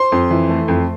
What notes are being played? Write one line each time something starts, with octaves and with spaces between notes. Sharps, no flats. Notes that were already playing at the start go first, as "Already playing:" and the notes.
Already playing: C5 C6
F2
E3
A3
F2